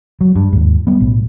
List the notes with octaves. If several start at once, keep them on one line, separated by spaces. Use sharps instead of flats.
F#3
G2
D#2 G#2
G3 B3
B1 A2